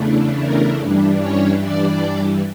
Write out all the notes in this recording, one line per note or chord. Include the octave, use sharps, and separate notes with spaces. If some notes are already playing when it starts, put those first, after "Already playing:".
Already playing: E2 C#3 E3 A3 D4
A#4
G2 E3 G3 D4
C#4 C#5
D4 D5